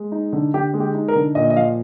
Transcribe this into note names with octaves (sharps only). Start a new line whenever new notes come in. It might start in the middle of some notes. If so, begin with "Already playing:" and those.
Already playing: G#3
D#4
D3
D3 G4
G#3
G4
D#4
A#4
D3
A#2 D#5
D#5
F3 F5